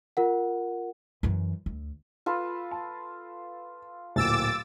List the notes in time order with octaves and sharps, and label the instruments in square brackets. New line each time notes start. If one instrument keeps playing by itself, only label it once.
[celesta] F4 A#4 F#5
[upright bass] F#2 E3
D2
[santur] F4 A4 B4
[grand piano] A5
[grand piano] D1 A#2 [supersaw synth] D6 E6 A6